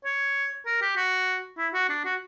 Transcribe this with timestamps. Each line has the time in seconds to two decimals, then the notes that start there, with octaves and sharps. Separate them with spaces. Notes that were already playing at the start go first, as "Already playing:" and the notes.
0.05 C#5
0.66 A#4
0.82 G4
0.97 F#4
1.58 E4
1.74 F#4
1.89 D4
2.05 F#4